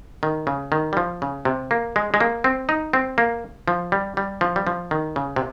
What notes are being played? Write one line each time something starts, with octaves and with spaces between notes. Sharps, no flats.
D#3
C#3
D#3
G3
F3
C#3
C3
A#3
G#3
G#3
A#3
C4
D#4
C4
A#3
F3
G3
G3
F3
G3
F3
D#3
C#3
C3